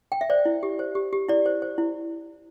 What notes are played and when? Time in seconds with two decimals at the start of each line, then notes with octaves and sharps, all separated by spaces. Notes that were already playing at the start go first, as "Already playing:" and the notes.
0.12 G5
0.21 E5
0.30 C5 D5
0.45 E4
0.63 G4
0.79 C5
0.95 G4
1.13 G4
1.29 E4 D5
1.46 C5
1.62 C5
1.78 E4